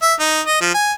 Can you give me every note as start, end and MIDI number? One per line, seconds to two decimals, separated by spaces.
0.02 0.14 76
0.20 0.41 63
0.46 0.59 75
0.61 0.72 53
0.75 0.93 80